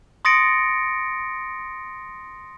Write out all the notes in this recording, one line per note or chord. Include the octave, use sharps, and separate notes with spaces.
C6 D#6 A6 A#6 C#7 D7